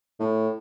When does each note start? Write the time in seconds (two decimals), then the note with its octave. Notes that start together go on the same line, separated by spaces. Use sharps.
0.20 A2